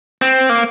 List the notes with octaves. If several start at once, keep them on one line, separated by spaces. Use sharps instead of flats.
C4
A#3